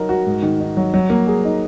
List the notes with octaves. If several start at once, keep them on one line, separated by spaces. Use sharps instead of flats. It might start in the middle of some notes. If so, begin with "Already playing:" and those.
Already playing: F#3 D#4 A#4
F#4
G#2
D#3
D#4
F#3
F#3
A#3
G#4
D#4